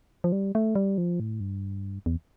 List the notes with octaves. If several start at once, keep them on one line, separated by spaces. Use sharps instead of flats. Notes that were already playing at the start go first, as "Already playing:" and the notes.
F3
G3
A3
G3
F3
A2
G2
E2